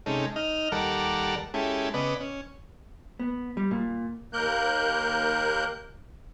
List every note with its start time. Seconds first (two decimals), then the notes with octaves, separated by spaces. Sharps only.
0.06 C3 G#3 C#4 D#4 A4
0.36 D#4 D#5 F6
0.72 D#2 G3 A4 A#4 D5 F#5
1.54 G#3 C#4 E4 G4 A4
1.94 C#3 B3 B4 D5 D#5
2.20 C#4
3.20 B3
3.57 G3
3.71 A#2
4.33 D#2 A#3 A#4 F#6 G6